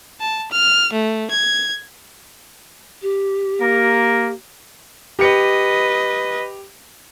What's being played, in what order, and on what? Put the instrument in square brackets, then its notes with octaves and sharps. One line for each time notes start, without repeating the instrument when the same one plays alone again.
[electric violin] A5
F6
A3
G#6
[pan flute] G4
[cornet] A#3 [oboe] A#4
[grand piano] G4 C#7 [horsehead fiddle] B4 D#5